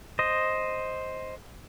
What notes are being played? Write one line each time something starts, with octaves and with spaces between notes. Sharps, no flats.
C5 D#5